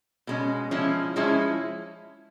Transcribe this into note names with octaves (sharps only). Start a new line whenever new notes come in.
B2 G#3 C#4
F3 G#3 C#4 E4
F3 G#3 C#4 E4